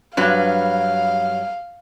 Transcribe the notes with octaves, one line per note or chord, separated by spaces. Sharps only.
G2 F#3 B4 F5